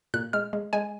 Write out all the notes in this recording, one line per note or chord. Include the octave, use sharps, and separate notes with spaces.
A#2 F#6
G#3 F6
G#3
G#3 G#5